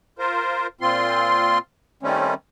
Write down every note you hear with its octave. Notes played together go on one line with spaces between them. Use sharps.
F4 A#4 C5
A#2 C4 F4 C6
D#3 G3 A3 C4 C#4